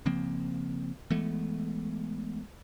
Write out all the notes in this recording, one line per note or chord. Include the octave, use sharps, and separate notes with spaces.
C#3 F3 A#3 C4
E3 G#3 A3 B3